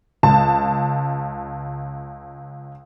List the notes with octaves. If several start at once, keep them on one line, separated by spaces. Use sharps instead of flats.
C#2 A5